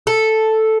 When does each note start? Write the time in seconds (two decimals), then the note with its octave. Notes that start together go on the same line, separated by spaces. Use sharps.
0.07 A4